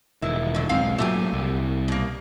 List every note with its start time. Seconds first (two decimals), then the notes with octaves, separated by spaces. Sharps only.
0.22 E1 D#3 E4
0.54 D3 F#3
0.69 B1 G#2 C4 F5
0.98 A#2 F#3 A3 G4 G#5
1.33 C2
1.88 B2 A#3